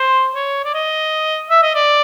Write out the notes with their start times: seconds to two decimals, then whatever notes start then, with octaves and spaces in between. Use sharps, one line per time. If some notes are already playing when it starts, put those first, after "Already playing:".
Already playing: C5
0.35 C#5
0.65 D5
0.74 D#5
1.50 E5
1.62 D#5
1.75 D5